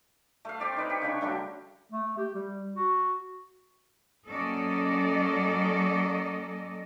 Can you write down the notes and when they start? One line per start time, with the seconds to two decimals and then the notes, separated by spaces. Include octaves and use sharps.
0.45 A3 F5
0.60 C4 G4 D5
0.77 D#4 B4 C#5
0.89 G4
1.02 C#3 D4 B5 C#6
1.21 D3 F#3 G3 A3
1.92 A3
2.18 G4
2.35 G3
2.76 F#4
4.28 F#3 A#3 C#4 A4 D5 D#5